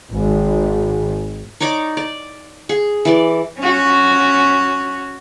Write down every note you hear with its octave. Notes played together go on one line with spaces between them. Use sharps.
G#1
D#4 C#5 D5 D6
D5
G#4
E3 D5
C#4 F#4